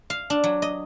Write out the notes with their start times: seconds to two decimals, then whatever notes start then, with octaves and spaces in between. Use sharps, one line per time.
0.10 F5
0.30 D4
0.44 F#3
0.62 D#5